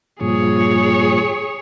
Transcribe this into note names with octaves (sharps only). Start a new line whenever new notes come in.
G2 A#2 F3 G#4 C#5